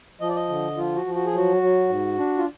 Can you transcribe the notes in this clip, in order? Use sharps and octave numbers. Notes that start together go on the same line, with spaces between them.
F3 D#5
D5
D#5
D3
F3 F4
F#4
F3
F#4
G#4
F#3 F#4
F#3
G#2
D4
F4